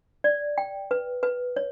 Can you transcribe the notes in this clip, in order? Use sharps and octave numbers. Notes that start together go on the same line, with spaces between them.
D5
G5
B4
B4
C#5